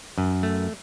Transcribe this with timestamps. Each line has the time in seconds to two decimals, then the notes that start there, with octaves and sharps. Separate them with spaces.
0.18 F#2
0.43 A3